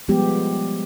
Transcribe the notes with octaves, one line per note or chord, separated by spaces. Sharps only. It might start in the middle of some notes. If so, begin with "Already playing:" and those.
F3 G3 G#3 B3 G4